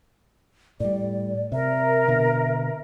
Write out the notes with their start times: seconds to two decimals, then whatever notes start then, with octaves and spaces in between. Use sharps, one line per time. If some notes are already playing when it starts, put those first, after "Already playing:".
0.80 A2 G3 D5
1.52 C3 A#4 E5
2.08 B2 D3